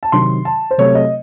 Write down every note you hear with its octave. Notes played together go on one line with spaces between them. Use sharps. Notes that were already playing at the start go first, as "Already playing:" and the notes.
A5
C3 D#3 F#3 C6
A5
C5
C3 F#3 A3 C4 C#5
D#5